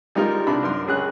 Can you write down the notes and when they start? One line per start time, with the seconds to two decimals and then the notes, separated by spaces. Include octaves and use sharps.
0.15 G3 G#3 D#4 F4 A#4
0.47 C2 D4 B5
0.63 F#2 A#4 C6
0.86 C#2 C#3 G#4 F#6